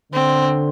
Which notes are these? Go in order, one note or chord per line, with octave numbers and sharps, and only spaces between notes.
D3 C4